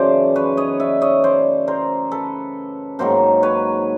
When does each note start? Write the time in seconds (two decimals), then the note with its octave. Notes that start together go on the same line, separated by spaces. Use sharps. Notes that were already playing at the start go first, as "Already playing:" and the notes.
Already playing: F#2 C#3 E3 A3 C5 D5
0.36 B4 C#5
0.57 C#5 D#5
0.80 D5 E5
1.02 C#5 D#5
1.24 C5 D5
1.67 A#4 C5
2.11 A4 B4
2.99 G#2 D#3 F#3 A#3 A#4 C5
3.43 B4 C#5